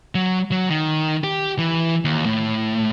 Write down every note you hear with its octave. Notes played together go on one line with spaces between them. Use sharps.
F#3
F#3
D#3
G4
E3
D#2
A2